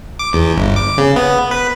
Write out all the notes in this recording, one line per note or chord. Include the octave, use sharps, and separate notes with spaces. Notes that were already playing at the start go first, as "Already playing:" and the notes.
D6
E2
G1
D6
C#3
B3
B4